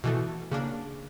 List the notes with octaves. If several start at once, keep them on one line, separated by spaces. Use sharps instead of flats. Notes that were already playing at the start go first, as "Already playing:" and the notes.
B2 E3 A3
C#3 A#3 D4